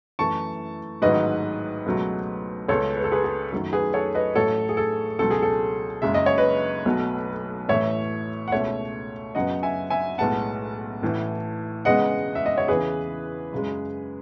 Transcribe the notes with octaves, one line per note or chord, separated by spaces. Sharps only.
F#2 E3 A3 A5 C#6
A1 G#2 D#3 F#3 B4 D#5
C#2 B2 F#3 A3
C#2 C#3 G#3 B3 A4 C#5
B4
A4
G#4 B4
G#4
F#2 D#3 F#3 A3
G#4 B4
A4 C#5
B4 D#5
A1 A2 F#3 A3 A4 C#5
G#4
A4
C#2 B2 F#3 A4
G#4
A4
F#1 F#2 C#3 G#3 E5
D#5
C#5
B4 D#5
B1 B2 F#3 A3
A1 A2 E3 A3 C#5 E5
F#5
C#2 B2 A3 C#5 E5
F#2 C#3 F#3 B3 D#5 F#5
E5 G#5
E5 G#5
B1 A2 G#3 B3 F#5 A5
A1 A2 E3
E1 E2 C#3 G#3 B3 D#5 F#5
E5
D#5
C#5
E2 C#3 E3 G#4 B4
F#2 C#3 G#3